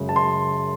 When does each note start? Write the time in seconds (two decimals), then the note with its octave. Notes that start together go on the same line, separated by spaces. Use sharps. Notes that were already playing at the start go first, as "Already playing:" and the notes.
Already playing: F#2 C#3 G#3
0.09 A5
0.16 C6